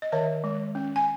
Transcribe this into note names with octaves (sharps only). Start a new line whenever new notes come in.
D#5
D#3 C#5 E5
G#3
C#4
G#5